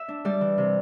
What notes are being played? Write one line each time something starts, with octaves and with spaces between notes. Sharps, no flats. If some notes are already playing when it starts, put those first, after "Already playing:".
Already playing: E5
D4
G3 D5
E3
C3